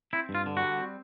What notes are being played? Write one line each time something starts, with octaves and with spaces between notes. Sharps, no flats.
C4 E4
G2
F4
D3
F#4
G3
C4